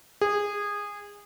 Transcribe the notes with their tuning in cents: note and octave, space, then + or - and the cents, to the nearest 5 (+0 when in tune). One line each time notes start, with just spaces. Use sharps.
G#4 -20